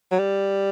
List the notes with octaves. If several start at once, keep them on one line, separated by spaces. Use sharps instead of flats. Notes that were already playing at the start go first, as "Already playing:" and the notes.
F#3
G3